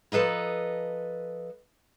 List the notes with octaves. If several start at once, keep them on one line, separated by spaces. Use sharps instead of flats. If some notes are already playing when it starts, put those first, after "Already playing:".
F3 A4 B4 D#5 A#5